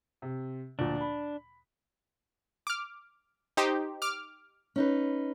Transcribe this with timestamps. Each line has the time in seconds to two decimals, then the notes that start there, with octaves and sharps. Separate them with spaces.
0.22 C3
0.79 D2 A#2 F3 D4
1.01 B5
2.67 D6 F6
3.57 D#4 G4 C5
4.02 D6 F6
4.76 C#4 D#4 B4